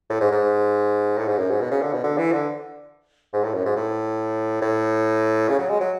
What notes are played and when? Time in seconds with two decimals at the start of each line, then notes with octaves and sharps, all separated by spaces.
0.10 A2
0.21 G#2
0.31 G#2
1.18 A2
1.28 G#2
1.38 F#2
1.50 G#2
1.61 B2
1.71 C#3
1.82 D3
1.93 B2
2.04 D3
2.18 E3
2.32 D3
3.33 G#2
3.44 A2
3.54 F#2
3.65 G#2
3.76 A2
4.61 A2
5.49 C#3
5.58 F#3
5.70 G#3
5.81 F#3